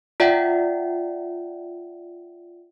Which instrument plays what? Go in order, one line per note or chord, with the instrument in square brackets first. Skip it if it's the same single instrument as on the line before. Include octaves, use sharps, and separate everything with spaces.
[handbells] F4 D5 E5 F#5 G5